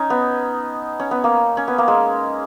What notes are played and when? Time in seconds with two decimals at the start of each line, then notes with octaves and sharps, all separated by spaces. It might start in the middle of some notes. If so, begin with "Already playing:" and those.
Already playing: C#4 D#4
0.10 B3
1.00 C#4
1.11 B3
1.24 A#3
1.57 C#4
1.68 B3
1.78 A#3
1.88 G#3